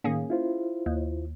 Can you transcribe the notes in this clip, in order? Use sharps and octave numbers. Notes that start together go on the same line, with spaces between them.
A2 D#3 A#3 C#4 G#4
E4 F4 C5
D#2